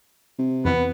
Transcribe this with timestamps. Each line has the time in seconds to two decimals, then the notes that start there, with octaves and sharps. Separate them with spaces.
0.39 C3
0.65 F2 E3 B3